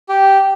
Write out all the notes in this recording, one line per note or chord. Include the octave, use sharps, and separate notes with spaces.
G4